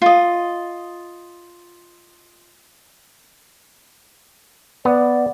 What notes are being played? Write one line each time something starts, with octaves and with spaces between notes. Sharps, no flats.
F4 D#5
B3 D5